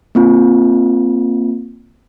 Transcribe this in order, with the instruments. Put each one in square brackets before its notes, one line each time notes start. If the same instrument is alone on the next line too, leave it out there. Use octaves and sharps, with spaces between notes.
[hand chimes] A#3 C4 F4